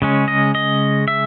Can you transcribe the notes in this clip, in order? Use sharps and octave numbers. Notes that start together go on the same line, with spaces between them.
C#3 G#3 C#4
D#5
D#5
E5